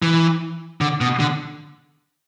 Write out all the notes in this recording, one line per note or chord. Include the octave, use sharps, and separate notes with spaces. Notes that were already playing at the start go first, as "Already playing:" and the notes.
E3
D3
B2
D3